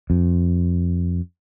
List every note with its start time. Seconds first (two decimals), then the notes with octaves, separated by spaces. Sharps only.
0.10 F2